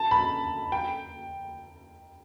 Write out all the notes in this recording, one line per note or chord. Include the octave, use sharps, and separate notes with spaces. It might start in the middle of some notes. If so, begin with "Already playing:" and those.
Already playing: A5
B5
G5